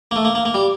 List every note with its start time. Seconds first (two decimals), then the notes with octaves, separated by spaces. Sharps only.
0.11 A#3
0.16 A3
0.25 A#3
0.35 A#3
0.45 A#3
0.54 G3